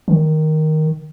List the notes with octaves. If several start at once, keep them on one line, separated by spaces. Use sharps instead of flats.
D#3